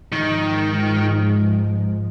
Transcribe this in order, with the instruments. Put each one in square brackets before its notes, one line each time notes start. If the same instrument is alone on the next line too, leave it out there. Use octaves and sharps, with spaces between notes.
[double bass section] G#2 F3 G#3 [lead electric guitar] D#3